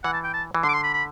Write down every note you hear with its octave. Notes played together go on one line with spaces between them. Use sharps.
E3 F#5
A5
G5
A5
E3
D3 C6
D6
C6
B5
B5